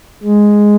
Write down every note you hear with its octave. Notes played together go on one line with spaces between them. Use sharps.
G#3